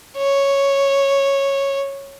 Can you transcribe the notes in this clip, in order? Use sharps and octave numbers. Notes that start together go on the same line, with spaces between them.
C#5